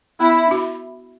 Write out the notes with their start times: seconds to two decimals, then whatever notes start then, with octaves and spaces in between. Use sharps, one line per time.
0.20 B3 E4
0.47 D4 F#4